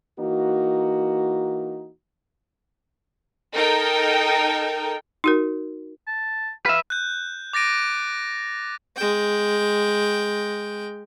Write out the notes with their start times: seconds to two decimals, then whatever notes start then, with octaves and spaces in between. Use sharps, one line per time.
0.20 E3 A#3 D#4 F#4
3.54 D#4 A4 A#4 G5
5.24 D#4 F#4 A#4
6.07 A5
6.66 B4 E5 F5
6.90 F#6 G6
7.53 D6 A6 A#6 D7 D#7
8.96 G#3 G5